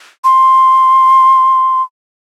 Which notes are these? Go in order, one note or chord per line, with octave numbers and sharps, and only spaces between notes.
C6